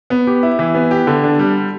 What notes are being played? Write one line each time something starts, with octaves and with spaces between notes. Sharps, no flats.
B3
G4
E4
E3
B3
G4
D3
D4
G3